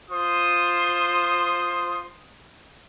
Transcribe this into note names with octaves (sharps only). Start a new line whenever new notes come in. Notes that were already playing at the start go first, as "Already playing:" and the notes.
F4 C5 C6 D#6